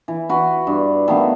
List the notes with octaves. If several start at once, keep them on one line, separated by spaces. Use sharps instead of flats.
E3
F#4 B4
G2
D#3 A3 B3 F5